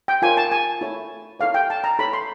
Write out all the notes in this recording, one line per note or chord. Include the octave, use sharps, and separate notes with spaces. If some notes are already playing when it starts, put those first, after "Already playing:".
G5
F4 A#4 C#5 G#5
A5
G#5
E4 A4 C#5
E4 A4 C#5 F5
G5
A5
A#5
E4 A4 C#5 B5
C6